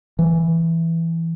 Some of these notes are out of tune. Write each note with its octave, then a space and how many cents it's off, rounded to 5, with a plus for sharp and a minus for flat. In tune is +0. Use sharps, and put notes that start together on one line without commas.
E3 +5